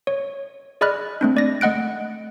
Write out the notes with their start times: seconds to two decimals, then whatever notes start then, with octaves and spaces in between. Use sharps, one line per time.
0.07 C#5
0.81 G#4 D5 D#5 B5 F6 F#6
1.21 A3 C4 D4
1.37 D5 A#6
1.61 A3 D#5 F#5 F#6 D7